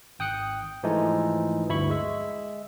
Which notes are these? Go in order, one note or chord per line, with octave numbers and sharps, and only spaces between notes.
G#1 G5 D#6 F#6 C#7
G#2 E3 F3 G#3 A3 D#4
G1 D2 G2 E4 B5 C#6
G#3 E5